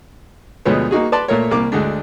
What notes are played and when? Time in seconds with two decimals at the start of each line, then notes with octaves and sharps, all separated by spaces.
0.65 D2 B2 F3 G#3 B4 C#5
0.91 A#3 D#4 F#4 G#4
1.12 B4 D5 A5 C6
1.28 A#2 A3 A#4 C#5
1.51 C2 A#3 D6
1.72 D2 D3 G#3 D4